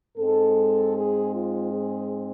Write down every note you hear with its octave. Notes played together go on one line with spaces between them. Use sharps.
G#2 G#3 C4 A4
G#4
F4
G#4